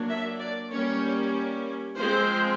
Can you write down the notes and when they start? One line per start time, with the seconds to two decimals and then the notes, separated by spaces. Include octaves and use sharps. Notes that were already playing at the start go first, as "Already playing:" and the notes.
Already playing: F#3 A#3 D4
0.08 E5
0.39 D5
0.70 G3 A#3 C#4 C#5
1.95 F3 G#3 C4 C5